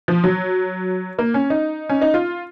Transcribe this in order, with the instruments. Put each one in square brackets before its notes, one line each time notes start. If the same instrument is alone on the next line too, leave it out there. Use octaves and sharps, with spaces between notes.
[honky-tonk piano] F3
F#3
A#3
C#4
D#4
C#4
D#4
F4